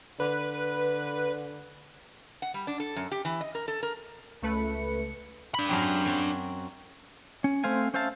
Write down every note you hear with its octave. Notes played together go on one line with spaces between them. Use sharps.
D3 B4
F#5
G3
D4
A4
F#2
G4
E3
D#5
A#4
A4
A#4
C#2 A3 B4 C#7
D4 B5
F#2 F#3 C4
F#3 C4
C#4
A3 C4 C5 F5 G#5
C#4 C5 E5 F5 A5